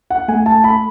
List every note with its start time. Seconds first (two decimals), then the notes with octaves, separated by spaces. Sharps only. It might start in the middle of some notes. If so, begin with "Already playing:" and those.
0.10 F#5
0.28 A3 G#5
0.46 A5
0.64 B5